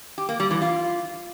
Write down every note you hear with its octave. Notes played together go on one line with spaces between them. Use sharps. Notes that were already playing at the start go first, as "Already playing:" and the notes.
G4
A#3
G3
E3
F4